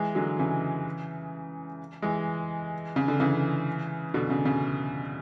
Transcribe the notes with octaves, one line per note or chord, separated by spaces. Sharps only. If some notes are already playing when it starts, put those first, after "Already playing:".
Already playing: E3 G#3
D3 F#3
C#3 E3
E3 G#3
C#3
D3
C#3 E3
B2 D3
C#3
C#3